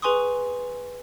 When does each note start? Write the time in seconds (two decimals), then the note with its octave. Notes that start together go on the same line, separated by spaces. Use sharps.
0.02 G#4 B4 G#5 C6 C#6 D#6